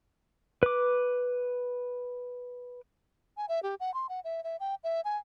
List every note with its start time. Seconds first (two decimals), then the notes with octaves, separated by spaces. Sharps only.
0.63 B4 D6
3.37 G#5
3.49 E5
3.63 G4
3.80 F#5
3.94 C6
4.09 F#5
4.24 E5
4.44 E5
4.60 G5
4.84 E5
5.04 G#5